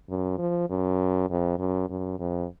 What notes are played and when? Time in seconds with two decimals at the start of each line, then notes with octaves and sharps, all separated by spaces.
0.09 F#2
0.38 F3
0.70 F#2
1.30 F2
1.59 F#2
1.89 F#2
2.19 F2